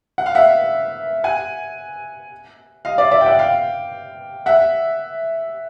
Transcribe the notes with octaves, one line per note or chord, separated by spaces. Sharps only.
F#5
F5
E5 F#5
F#5 G#5
D#5 F5
D5 E5
D5 E5
G5
E5 F#5
F5 G5
E5 F#5